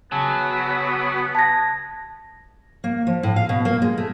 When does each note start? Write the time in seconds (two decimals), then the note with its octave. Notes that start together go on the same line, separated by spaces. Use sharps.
0.12 C#3 F#3 B3 G#5 A5
1.35 A5 G#6 A#6
2.84 A#3
3.07 F3
3.23 A2
3.36 F5
3.49 B2
3.65 A#3
3.82 G#3
3.98 A3